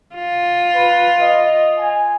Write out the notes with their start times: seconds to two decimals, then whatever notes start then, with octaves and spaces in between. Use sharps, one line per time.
0.15 F4
0.75 B4
1.19 D#5
1.79 G#5